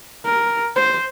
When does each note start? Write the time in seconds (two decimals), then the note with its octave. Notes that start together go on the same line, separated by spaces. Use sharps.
0.25 A#4
0.76 C5